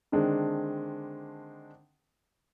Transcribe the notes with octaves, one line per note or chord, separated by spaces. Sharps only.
D3 D#3 G#3 C4 D4